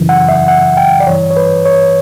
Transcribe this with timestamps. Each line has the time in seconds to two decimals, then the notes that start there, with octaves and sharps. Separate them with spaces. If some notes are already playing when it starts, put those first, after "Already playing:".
Already playing: F#2 C#3 E3
0.09 F#5
0.28 E5
0.48 F#5
0.77 G5
1.00 D5
1.07 G2 E3 C#5
1.30 C#5
1.37 B4
1.65 C#5